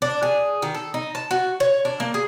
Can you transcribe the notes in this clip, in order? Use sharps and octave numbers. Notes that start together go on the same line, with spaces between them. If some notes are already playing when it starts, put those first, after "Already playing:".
D4
G#4
D#3
A4
D#4
A5
F#4
C#5
D4
A#3
G#4